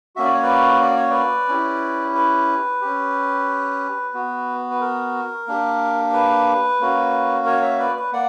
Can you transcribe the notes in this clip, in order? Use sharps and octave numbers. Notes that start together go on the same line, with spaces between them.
A#3 C#4 F#4 E5
D5
C#5
B4 D5
D5
C#5
B4 D5
C#4 E4 G4
B4
C#4 G4
B3 F#4
B4
A#4
A#3 D4 G4
B4
A#3 C#4 F#4
A#4 C#5
C#5 E5
B4 D5
B4
A#3 D5 F#5